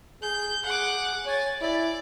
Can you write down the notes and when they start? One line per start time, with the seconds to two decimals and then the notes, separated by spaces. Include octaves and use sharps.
0.22 G#4 G6
0.65 G#4 F#5 D6
1.26 C#5 G#5 A6
1.61 E4 D5